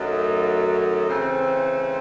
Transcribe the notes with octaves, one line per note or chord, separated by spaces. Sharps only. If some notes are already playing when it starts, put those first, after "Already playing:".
Already playing: F#2 D#3 F#3 A3 D#4
C#3 E3 A3 C4